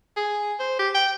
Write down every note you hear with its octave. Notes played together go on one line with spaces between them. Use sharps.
G#4
C5
G4
G5